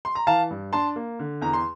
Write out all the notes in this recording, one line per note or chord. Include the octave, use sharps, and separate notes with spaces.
C6
A#5
E3 F5 A5
G2
D4 A5 C6
A#3
D3
E2 A#5
C6